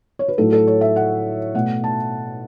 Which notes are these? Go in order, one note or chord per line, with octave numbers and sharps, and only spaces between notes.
C#5
B4
A2 F#3 A3 A4
A4
C#5
E5
F#5
B2 A3 F#5
A5